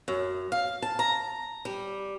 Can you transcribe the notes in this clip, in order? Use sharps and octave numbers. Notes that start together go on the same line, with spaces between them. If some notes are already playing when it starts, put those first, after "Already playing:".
F#2
F5
A5
A#5
G3